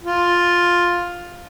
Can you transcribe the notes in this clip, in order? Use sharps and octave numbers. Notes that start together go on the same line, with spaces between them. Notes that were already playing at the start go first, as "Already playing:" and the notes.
F4